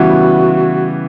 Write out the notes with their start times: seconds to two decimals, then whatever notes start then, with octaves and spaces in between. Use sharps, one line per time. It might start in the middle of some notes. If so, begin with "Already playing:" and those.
Already playing: C#3 E3 G3 B3 E4 F#4